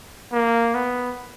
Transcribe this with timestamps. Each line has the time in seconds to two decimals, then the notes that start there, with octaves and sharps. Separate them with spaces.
0.33 A#3
0.74 B3